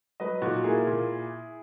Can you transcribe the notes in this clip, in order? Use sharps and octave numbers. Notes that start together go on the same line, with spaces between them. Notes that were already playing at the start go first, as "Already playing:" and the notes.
F#3 B4 D#5
A#2 D#4 F#4
A#3 E4 G#4
A#2